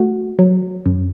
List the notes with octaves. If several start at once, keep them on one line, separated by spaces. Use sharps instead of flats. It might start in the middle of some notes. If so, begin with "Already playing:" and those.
Already playing: A3 F#4
F#3
F#2